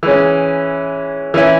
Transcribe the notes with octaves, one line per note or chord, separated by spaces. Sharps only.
E3 G#3 C#4
E3 C#4 E4